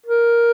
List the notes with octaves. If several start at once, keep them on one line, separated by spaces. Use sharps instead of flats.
A#4